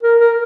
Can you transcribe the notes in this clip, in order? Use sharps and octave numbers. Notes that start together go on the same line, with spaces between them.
A#4
A#4